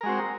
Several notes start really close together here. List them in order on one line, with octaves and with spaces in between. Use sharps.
A#4 G#3 F#4 C4